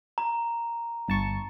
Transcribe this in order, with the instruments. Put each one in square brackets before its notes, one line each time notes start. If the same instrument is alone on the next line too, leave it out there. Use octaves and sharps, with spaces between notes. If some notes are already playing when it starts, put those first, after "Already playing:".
[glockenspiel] A#5
[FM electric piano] G1 A5 C#6